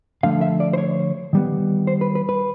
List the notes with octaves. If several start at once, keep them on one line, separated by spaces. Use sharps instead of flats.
D3 F3 A3 F5
E5
D5
C5
C#5
D#3 G3 B3
C5
B4
B4
B4